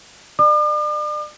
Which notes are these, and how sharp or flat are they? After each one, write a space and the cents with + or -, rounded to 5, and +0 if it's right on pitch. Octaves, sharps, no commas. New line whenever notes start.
D5 +35 D6 +45